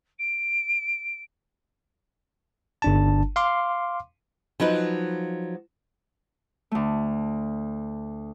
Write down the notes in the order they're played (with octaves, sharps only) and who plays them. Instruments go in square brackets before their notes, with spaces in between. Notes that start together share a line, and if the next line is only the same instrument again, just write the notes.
[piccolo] D7
[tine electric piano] G1 D4 A5
F5 C6 D6
[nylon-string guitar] F3 F#3 D#4 B4
[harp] D2 A3